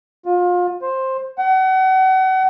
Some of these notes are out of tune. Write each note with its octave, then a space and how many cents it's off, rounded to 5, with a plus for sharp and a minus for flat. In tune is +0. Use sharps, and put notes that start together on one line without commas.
F4 +30
C5 +10
F#5 +35